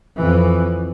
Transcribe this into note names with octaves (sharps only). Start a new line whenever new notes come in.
F2 E3